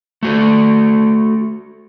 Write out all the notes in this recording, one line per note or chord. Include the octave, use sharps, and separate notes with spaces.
A3 F#4 A4